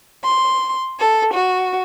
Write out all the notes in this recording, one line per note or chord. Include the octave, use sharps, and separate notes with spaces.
C6
A4
F#4